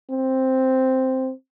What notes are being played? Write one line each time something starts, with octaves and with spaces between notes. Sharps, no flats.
C4